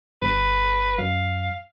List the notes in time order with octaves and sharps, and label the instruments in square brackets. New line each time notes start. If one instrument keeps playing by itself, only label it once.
[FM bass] G1 [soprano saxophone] B4
[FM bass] F#2 [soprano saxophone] F5